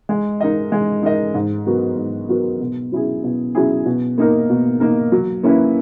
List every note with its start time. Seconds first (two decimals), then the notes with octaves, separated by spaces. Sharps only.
0.09 G#3
0.40 D#4 A#4 D#5
0.72 G#3
1.03 D#4 A#4 D#5
1.35 G#2
1.66 F#3 B3 F#4 A#4
1.97 G#2
2.29 F#3 B3 F#4 A#4
2.61 B2
2.92 F#3 C#4 E4 G#4
3.24 B2
3.55 F#3 C#4 E4 G#4
3.85 B2
4.18 A#3 D#4 A#4
4.50 B2
4.80 A#3 D#4 A#4
5.12 F#3
5.43 A#3 C#4 E4 B4